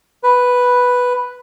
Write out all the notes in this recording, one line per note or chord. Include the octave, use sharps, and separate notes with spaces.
B4